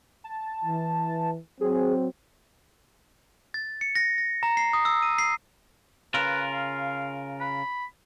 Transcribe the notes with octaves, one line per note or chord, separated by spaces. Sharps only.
A5
E3
F#3 C4 G#4
A6
C#7
A#6
A#6
A#5
C7
D#6
E6
D#7
C7
C#3 F4 A#4 B4
F5
B5